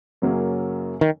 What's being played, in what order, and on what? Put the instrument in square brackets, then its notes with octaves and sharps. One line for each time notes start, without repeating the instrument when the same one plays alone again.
[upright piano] F#2 C#3 F#3 A#3 C#4
[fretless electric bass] D#3